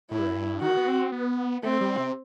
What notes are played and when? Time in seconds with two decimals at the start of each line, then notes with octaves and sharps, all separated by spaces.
0.11 A2 E4
0.19 G2
0.27 F#2
0.35 G2
0.61 D#3 F#4
0.77 B3
0.88 C4
1.12 B3
1.63 A3 C4
1.81 G3
1.97 C3